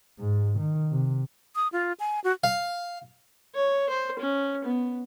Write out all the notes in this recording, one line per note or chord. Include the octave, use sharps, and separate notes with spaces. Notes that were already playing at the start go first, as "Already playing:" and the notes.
G#2
D#3
C3
D#6
F4
G#5
F#4
F5
C#5
C5
C#4
B3